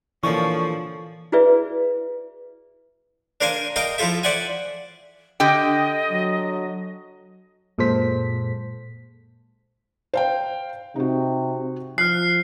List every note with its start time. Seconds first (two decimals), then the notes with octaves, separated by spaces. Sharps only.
0.24 A#2 D3 E3 F3 C#4 C#6
1.32 E4 F#4 G#4 B4 D5 E5
3.41 D4 A#4 C5 F5 G#5
3.76 A#4 D#5 F5 G5 A#5
3.98 F3 E4 F4 A4 E5
4.23 C5 D5 E5 F#5 G#5
5.40 D3 G4 D#5 G5
6.10 F#3
7.78 F#2 A#2 G#3 A4 C5 B6
10.14 C5 F5 G5
10.96 C3 D#4 F#4
11.98 F3 F6 F#6 C7